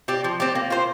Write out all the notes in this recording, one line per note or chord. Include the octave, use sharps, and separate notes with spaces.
C4 G4 D5
F3
C4 G4 D5
A#3
F4 C5